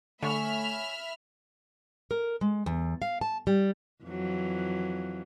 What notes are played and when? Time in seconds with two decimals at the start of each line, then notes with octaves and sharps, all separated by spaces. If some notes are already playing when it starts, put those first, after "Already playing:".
0.23 D3 A3 C#5 E5 G#5 B5 F6
2.11 A#4
2.41 G#3
2.66 E2
3.02 F5
3.21 A5
3.47 G3
4.04 F2 E3 F#3